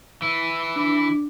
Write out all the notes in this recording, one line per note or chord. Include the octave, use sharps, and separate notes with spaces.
E3 E4
D4